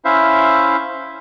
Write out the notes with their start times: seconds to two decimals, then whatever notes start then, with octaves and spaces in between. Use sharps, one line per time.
0.05 C#4 E4 C5 E5 F5